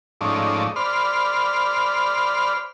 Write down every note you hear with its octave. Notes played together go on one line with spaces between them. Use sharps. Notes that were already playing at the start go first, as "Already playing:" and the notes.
G#2 F3 A3 C#4 D#4 D5
C5 D5 B5 F6